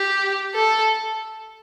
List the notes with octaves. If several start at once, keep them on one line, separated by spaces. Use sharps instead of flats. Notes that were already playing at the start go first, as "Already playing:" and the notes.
Already playing: G4
A4